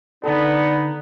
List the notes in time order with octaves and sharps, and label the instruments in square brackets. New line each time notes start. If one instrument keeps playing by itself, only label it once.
[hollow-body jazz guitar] D3 A4 [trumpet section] B3 [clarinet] D#4 [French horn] D5